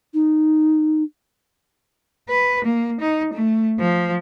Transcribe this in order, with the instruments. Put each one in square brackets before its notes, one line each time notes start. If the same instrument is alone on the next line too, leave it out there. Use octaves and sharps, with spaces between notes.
[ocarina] D#4
[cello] B4
A#3
D#4
A3
F3